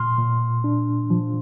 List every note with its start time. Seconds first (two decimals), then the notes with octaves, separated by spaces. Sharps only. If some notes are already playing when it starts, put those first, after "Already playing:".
Already playing: A#2 C6 F6
0.18 A#2
0.64 D4
1.10 F3